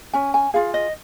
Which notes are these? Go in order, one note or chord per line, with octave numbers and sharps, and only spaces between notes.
C#4 G#5
G#5
F4 G#4 F5
D#5